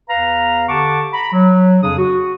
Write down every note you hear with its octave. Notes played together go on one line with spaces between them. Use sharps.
E2 B4 F5 A#5
D3 G4 F#5 A5 C#6 D6
A#5 B5
F#3
F2 C#3 D4 G#4 D#6
F#4